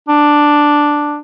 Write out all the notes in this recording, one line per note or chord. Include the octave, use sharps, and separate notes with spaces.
D4